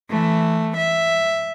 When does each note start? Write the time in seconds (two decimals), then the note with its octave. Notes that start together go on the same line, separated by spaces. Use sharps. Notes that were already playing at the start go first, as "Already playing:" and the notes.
0.11 E3 A3
0.77 E5